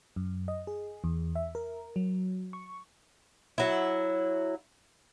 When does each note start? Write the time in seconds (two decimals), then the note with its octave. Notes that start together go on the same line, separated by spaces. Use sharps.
0.16 F#2
0.48 D#5
0.67 G#4
1.04 E2
1.36 E5
1.55 A#4
1.96 F#3
2.53 C#6
3.58 F#3 E4